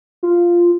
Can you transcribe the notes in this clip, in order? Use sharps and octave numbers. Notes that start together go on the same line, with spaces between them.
F4